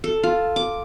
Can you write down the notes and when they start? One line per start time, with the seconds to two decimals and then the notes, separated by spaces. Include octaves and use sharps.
0.04 A4
0.23 F4
0.56 D6